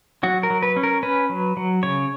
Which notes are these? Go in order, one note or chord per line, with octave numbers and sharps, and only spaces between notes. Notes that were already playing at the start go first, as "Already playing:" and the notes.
F#3 F#4
A#4
F#3
B4
C#4
A#4
C#4 B4
F#3
F#3
C#3 C#5